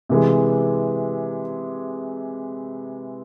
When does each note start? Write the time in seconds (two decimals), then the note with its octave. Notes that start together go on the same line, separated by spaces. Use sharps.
0.09 C3 E3 G#3